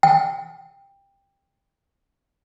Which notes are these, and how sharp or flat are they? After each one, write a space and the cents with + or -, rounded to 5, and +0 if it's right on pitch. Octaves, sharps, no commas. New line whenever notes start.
G5 +15